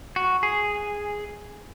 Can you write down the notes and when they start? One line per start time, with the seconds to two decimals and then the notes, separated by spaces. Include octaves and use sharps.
0.16 F#4
0.43 G#4